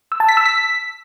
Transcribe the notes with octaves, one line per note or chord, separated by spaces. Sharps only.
E6
A5
B6
E6
B6